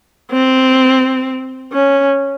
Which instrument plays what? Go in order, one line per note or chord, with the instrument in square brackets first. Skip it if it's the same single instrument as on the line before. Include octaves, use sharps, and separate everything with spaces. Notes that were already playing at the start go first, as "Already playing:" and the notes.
[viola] C4
C#4